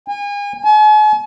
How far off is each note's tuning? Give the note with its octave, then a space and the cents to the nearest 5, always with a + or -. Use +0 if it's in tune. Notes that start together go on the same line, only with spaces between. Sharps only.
G#5 -35
G#5 +45